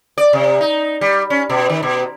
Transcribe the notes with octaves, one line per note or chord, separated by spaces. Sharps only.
D5
C3
D#4
G3
C#4
B2
D#3
B2